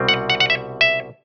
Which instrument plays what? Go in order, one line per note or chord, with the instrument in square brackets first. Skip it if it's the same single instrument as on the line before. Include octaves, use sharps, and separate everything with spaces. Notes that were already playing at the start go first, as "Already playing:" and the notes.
Already playing: [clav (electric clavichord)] C2 B2 G3 C4
F#5
F#5
F#5
E5
E5